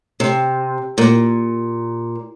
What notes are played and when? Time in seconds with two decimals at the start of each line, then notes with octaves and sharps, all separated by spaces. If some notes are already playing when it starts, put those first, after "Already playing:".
0.20 C3
0.98 A#2